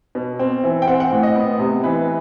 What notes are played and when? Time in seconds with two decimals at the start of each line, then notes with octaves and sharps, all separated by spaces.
0.15 B2
0.39 C4
0.64 E3
0.82 G5
0.87 C4 F#5
1.00 F#5
1.12 A2
1.23 D#5
1.36 B3
1.59 C3
1.84 E3 B4